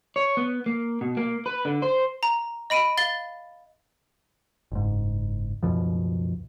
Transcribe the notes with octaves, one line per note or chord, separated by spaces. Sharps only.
C#5
B3
A#3
B2
A#3
B4
D3
C5
A#5
D#5 B5 D7 D#7
F5 A6 G7
F#1 G#2
C#2 F#2 B2 F3